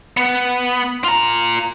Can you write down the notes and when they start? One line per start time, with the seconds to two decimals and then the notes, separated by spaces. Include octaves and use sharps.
0.17 B3
1.04 F4 A#5